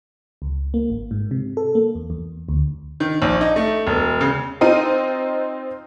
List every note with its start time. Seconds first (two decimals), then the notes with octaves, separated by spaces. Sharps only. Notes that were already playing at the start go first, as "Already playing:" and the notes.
0.42 C#2
0.74 A#3
0.90 G#1
1.11 G#2
1.31 C3
1.57 A4
1.75 A#3
1.95 E2
2.10 E2
2.49 D2
3.00 D#3
3.22 A#1
3.41 D#4
3.56 A3
3.87 E1
4.21 C#3
4.61 C4 D#4 F4 D#7